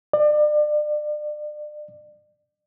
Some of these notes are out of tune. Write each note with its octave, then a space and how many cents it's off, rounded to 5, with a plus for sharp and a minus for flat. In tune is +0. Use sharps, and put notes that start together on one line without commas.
D5 +35